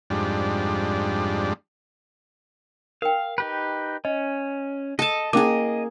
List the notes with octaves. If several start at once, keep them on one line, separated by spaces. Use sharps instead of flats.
F2 G#2 G3 D4
A#4 F5 G5
D#4 G4 B4
C#4 D#5
A4 D#5 A5
A#3 C#4 E4 G#4 D#5 D6